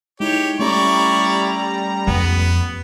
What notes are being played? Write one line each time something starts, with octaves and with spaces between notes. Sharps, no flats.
G#3 D#4 E4 G4 C#5
G3 A3 C#4 E4 G4 D5 A#5 C#6
F2 B3